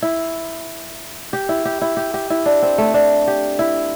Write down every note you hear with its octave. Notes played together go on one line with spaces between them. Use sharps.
E4
G4
E4
G4
E4
G4
G4
E4
D4
C4
A3
D4
G4
E4